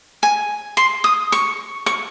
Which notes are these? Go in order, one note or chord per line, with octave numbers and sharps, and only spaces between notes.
G#5
C6
D#6
C#6
C#6